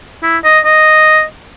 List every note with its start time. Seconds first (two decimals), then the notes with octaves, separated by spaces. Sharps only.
0.23 E4
0.44 D#5
0.65 D#5